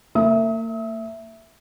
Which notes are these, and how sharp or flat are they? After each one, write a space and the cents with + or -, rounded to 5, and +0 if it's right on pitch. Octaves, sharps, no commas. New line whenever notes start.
A#3 -40 E5 +5 D#6 +40